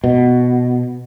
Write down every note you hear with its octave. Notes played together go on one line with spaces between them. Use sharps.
B2